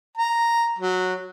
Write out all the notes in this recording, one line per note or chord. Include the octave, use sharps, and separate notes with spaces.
A#5
F#3